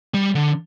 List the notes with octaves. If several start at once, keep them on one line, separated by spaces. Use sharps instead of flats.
G3
D3